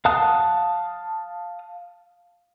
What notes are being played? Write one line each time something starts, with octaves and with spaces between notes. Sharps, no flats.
F5 F#5 A5 D#6 F#6